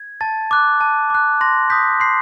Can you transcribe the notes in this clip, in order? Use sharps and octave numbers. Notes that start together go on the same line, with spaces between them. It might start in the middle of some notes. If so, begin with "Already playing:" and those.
Already playing: G#6
A5 A6
D6 F#6
A5
D6 F#6
C6 A#6
D#6 G6 B6
C6 C7